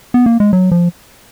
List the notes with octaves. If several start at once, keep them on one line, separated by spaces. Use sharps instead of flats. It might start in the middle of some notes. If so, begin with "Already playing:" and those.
B3
A#3
G#3
F#3
F3